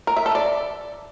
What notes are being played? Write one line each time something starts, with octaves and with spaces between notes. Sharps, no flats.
A#4
E5
A4
D5